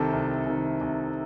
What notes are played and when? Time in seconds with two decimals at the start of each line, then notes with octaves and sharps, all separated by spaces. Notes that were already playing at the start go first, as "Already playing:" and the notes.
Already playing: C2 C3 D#3 A4
0.13 C2
0.47 C3 D#3
0.81 C2